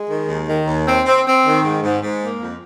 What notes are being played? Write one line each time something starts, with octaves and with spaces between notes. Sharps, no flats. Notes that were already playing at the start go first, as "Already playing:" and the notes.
Already playing: G#3
D#3
D#2
D#3
D#2
C4
C4
C4
D#3
G#2
G#2
G#2
A#3
F2